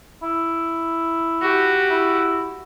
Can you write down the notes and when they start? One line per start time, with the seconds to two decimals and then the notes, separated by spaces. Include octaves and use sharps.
0.23 E4
1.41 F#4 G4
1.90 E4